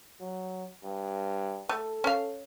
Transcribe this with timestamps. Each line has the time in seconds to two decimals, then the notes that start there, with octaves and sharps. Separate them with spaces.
0.21 F#3
0.84 G2
1.69 A3 A4
2.04 C#4 F5